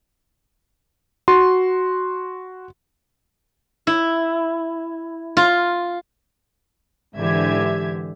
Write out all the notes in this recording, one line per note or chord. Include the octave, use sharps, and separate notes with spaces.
F#4 C6
E4
F4
G#2 D3 E3 G4 E5 G#6